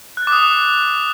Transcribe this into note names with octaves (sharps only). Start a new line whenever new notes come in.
F#6
A6
D6
D#6